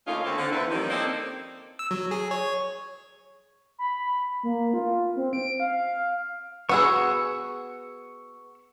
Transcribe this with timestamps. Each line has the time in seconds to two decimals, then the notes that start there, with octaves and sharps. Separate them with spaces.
0.07 D2 A3 A#3 C#4 D#4 F4
0.23 D2 D3 A#3 C4 F5
0.37 D3 C4
0.51 E2 E4 B4
0.71 D#3 F3 G3 A#3 C#4 D#4
0.90 A#3 C4 D#4 A4 D5
1.79 E6
1.91 F#3
2.11 G#4
2.31 C#5
3.79 B5
4.43 A#3
4.74 F4
5.16 C4
5.33 D7
5.60 F5
6.69 B3 F#4 G#4 C#6 E6